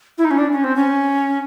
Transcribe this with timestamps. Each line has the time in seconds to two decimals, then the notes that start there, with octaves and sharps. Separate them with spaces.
0.18 E4
0.25 D#4
0.31 C#4
0.38 D4
0.52 C#4
0.64 C4
0.76 C#4